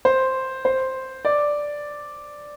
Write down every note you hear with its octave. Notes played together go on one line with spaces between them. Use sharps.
C5
C5
D5